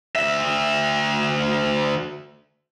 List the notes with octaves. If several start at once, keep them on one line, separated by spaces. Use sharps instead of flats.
D2 E5